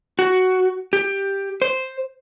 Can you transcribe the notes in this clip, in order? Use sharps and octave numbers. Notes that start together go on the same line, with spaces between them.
F#4
G4
C5